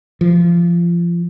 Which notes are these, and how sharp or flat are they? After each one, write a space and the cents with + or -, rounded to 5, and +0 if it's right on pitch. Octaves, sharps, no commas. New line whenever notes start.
F3 -25